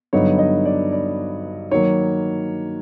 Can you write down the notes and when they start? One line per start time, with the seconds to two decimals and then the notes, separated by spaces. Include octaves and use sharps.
0.13 G2 D3 F#3 B3 D#4 C#5
0.39 D#5
0.65 D5
0.92 D5
1.71 D#3 F#3 A#3 C#5